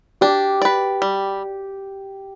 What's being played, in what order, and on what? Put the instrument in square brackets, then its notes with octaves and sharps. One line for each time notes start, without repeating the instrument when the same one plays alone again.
[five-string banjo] D4 [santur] G4
[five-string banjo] B4 D5
G3